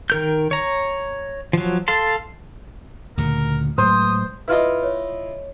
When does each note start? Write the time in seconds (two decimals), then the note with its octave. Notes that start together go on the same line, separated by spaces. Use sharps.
0.10 D#3 A#4 G6
0.51 C#5 A#5
1.53 F3 F#3
1.88 A4 F5 A5 C6
3.18 D2 A#2 C#3 A#4
3.78 A2 F#3 G#3 C5 D#6
4.48 E4 F4 B4 D#5 F6
4.83 C#5